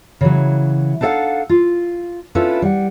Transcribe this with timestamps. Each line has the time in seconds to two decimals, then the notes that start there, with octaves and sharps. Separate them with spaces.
0.21 C#3 E3 F#3
1.01 D4 D#4 A4 C#5 F5 F#5
1.49 F4
2.35 C#4 D4 E4 F4 A4 B4
2.62 G3 F#5